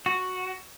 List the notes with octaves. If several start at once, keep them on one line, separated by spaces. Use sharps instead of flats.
F#4